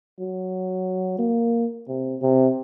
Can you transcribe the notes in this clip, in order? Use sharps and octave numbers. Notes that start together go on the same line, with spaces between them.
F#3
A#3
C3
C3